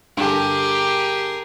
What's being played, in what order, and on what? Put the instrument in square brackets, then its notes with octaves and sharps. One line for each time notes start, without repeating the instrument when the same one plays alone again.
[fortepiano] G2 D3 [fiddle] G4 [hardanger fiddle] G#4 A#4